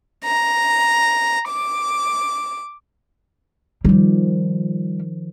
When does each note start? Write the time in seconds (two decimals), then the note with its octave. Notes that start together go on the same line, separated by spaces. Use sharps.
0.25 A#5
1.48 D6
3.85 D#3 F3 G3